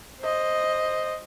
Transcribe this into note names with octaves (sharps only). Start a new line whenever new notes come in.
C5 D#5